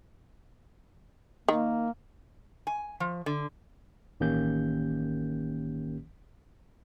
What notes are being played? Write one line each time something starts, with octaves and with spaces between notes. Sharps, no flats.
D#3 A#3
G#5
F3
D3
A1 D#3 A#3 C#4 G4 G6